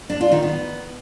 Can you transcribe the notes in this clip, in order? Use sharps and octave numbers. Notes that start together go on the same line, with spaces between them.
D4
F4
D#3
B3